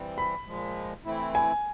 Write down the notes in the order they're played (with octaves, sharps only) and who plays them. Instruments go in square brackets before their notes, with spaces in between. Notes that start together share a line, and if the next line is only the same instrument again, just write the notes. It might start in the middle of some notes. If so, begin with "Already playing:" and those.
Already playing: [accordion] E3 G3 C4
[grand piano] B5
[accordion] A#2 F3 G#3
E3 A3 C4 E4
[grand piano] G#5